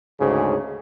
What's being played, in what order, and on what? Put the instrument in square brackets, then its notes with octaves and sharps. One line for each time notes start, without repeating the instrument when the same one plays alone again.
[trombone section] D2 G#2 C#3